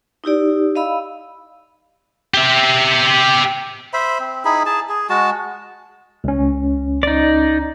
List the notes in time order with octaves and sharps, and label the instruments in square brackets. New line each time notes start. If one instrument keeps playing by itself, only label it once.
[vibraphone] D#4 E4 G4 D5
D#5 F5 B5 E6
[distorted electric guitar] G4 E5
[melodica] C5 E5 B5
C4
D#4 E4 G#4 B5
G#4 A5
G#4
G#3 F#4 A5
[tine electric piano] C#2 C#4
[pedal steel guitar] D#4 D5